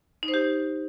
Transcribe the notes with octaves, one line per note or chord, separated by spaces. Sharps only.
D#4
C5
G4